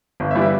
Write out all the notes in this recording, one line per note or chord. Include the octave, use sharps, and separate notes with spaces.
G1
E5
E3 G3
E5